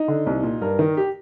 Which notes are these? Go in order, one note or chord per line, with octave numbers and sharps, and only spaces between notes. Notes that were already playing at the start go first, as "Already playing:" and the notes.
Already playing: D#4
D3
C2
A#2
G2 A#4
D#3
G4